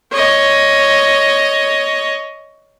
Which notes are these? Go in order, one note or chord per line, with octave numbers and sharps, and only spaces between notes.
C#5 D#5